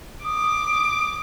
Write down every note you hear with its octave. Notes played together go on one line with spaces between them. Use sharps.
D6 D#6